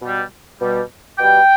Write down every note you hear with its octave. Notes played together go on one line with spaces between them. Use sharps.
B2
G3
B2 G3
B2 G3 G5